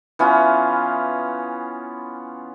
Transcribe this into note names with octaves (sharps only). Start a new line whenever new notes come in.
E3 B3 C#4 F4